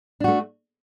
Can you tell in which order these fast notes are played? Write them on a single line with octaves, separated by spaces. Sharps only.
D4 F#4 A3